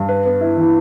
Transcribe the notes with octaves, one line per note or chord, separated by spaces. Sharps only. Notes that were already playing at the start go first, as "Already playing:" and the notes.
Already playing: G2
B4
B3
E4
E3